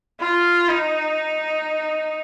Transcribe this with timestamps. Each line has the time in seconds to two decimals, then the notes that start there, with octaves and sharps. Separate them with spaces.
0.20 F4
0.69 D#4